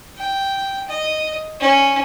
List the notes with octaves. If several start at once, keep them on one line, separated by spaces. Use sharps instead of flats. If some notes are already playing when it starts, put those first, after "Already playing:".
G5
D#5
C#4